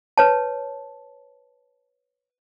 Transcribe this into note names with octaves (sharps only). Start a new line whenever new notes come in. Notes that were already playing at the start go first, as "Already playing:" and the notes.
B4 C#5 A5